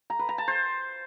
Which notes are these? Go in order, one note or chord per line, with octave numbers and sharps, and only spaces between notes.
A#5
B4
A#5
A5
C5